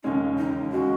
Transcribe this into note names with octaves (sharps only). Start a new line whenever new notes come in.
E1 D#2 C#3 G#3 C#4 D#4
D#4
C#3 G#3 C#4 F#4